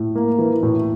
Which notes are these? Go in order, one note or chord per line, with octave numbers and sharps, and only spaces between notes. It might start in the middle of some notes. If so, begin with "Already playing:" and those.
Already playing: A2
A#3
E3
A2